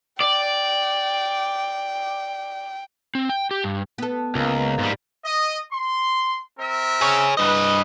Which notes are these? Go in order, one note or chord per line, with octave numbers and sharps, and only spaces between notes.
D5 G5
C4
G5
G4
G2
B3 A4
C#2 A#3 A#4
G#2 G3
D#5
C6
C4 A#4 E5
G#4 C#5
G2 B4 D#5